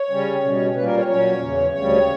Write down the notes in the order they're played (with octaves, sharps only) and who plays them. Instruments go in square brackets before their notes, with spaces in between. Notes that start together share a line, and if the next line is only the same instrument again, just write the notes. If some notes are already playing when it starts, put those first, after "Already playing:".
Already playing: [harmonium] C#5
C#3 G3 C#4
B2 G3 C#4
A#2 G3 A#3 B4
A#4
C#5
A#2 F#3 C#4 C#5
E2 C#3 E3
D2 C#3 G3 C#5